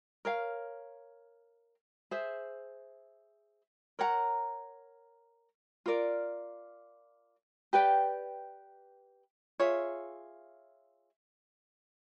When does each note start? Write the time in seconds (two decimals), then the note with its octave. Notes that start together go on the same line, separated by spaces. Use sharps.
0.25 A#4 C#5 F5
2.11 G#4 C5 E5
3.99 A#4 C#5 F#5 A#5
5.86 F4 A#4 D5
7.73 G4 B4 D5 G5
9.60 F4 G#4 C#5 E5